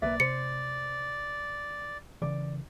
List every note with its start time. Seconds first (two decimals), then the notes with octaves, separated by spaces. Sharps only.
0.02 B1 E3 A#3 B4 D5 E5
0.20 C3 C5 C#7
2.22 C#3 E3 D5